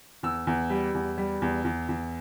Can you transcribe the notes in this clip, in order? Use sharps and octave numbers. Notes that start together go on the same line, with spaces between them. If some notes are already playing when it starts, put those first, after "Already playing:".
E2 E6
E2
G3
E2
G3
E2
E2
E2